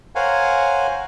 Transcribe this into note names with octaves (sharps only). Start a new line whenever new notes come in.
A#4 C5 C#5 F5 F#5 G#5